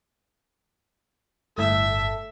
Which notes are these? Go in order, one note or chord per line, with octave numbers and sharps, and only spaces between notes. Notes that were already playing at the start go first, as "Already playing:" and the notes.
G1 A2 A4 E5